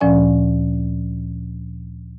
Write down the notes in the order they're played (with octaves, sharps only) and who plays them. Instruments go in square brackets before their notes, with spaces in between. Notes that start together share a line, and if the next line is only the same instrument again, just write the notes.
[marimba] D2 A#2 F3 C#4 D5 G#5